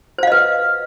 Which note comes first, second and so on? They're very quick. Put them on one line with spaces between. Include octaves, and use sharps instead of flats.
C5 F5 D#5 B4